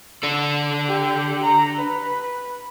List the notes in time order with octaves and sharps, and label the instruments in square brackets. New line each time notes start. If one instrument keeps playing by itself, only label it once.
[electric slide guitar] D4 A4
[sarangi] G4
A#5
B4